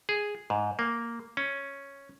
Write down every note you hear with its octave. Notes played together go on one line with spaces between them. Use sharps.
G#4
G#2
A#3
C#4